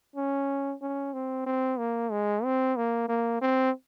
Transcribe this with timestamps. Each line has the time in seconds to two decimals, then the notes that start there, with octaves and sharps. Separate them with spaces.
0.16 C#4
0.82 C#4
1.13 C4
1.47 C4
1.79 A#3
2.11 G#3
2.44 C4
2.77 A#3
3.08 A#3
3.41 C4